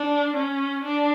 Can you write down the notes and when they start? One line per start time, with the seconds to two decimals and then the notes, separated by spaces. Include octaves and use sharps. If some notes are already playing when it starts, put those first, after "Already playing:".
Already playing: D4
0.36 C#4
0.84 D4